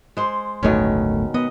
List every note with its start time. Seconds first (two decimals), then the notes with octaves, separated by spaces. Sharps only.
0.17 G#3 C5
0.63 D1 G1 B2 D#3 A3 C#4
1.34 B3 D#5